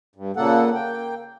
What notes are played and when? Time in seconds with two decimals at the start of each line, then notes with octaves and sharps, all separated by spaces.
0.16 G2
0.37 A#2 C#3 A#3 A4 F#5
0.75 A#3 G5